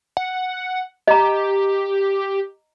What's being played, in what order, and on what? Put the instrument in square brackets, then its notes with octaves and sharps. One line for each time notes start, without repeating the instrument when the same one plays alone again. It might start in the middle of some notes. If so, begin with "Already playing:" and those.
[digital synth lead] F#5
[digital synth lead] G4 [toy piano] D#5 A#5